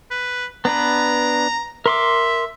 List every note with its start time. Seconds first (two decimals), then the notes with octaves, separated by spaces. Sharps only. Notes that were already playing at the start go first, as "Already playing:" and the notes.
0.11 B4
0.65 B3 D4 B4 A#5
1.86 A#4 E5 C6 D6